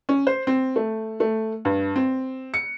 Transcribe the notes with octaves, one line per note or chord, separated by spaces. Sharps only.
C#4
C5
C4
A3
A3
G2
C4
C#7